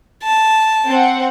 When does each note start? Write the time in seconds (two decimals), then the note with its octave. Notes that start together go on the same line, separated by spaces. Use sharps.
0.23 A5
0.87 C4 F#5